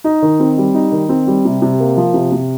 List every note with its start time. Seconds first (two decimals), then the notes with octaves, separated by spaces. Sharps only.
0.04 D#4
0.22 D#3
0.40 C4
0.58 G3
0.74 D#4
0.92 D#3
1.09 C4
1.27 G3
1.45 C3
1.62 C3
1.80 A#3
1.97 F3
2.14 C3
2.32 C3